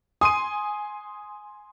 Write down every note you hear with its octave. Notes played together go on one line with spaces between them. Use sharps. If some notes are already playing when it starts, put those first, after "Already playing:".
G#5 C6 D#6 D#7